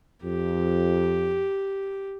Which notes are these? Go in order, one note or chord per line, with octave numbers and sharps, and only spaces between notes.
F2 G4